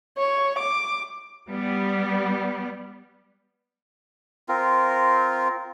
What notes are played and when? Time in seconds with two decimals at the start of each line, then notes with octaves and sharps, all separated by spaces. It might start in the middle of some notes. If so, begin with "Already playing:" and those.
0.18 C#5
0.59 D6
1.49 G3 B3
4.49 C4 F4 A#4